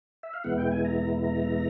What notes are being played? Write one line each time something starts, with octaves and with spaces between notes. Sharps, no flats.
E5
F5
E2 B2 G#3 B3 E4 F#5
G5
G#5
A#5
A#5